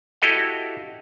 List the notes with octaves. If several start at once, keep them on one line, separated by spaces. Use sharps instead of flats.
E4 F#4 G4 A4 D#5 F5